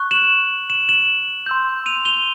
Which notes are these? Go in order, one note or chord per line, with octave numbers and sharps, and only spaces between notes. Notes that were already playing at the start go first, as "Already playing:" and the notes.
Already playing: C#6 F#6
E7 F#7
E7 F#7
E7 F#7
C6 E6 G6
D#7 F7
F7 G7